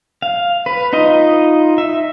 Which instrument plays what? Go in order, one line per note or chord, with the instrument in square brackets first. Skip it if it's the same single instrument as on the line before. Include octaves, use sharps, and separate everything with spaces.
[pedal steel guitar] F5
B4
D#4 F4 D#5
E5